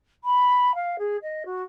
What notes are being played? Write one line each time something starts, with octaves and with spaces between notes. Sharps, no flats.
B5
F5
G#4
D#5
F#4